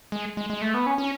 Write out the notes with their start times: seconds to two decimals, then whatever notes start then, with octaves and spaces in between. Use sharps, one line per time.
0.12 G#3
0.37 G#3
0.50 G#3
0.62 A3
0.74 B3
0.86 C#4
0.98 C#4